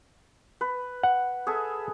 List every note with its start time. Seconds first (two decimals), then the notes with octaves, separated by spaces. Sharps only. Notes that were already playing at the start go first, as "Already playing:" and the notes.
0.61 B4
1.03 F#5
1.47 G#4 A4 E5